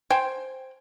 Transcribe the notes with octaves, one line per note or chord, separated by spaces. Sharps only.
C5 G5 G#5